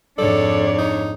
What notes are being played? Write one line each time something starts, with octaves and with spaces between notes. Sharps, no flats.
F2 G#2 D4 A4 C#5 D5
D#4